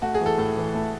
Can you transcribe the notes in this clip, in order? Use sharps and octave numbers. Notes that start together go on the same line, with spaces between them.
A3 F#4
G#4
E3
A4
A2 A4
E3
A3